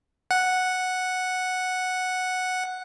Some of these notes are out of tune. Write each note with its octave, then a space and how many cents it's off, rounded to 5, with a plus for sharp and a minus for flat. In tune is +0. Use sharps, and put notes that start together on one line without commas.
F#5 -5